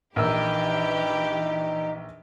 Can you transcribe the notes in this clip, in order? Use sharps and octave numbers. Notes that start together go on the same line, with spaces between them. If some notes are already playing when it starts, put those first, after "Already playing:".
A#1 E3 D#4 G4 A#4 B4 G5 E6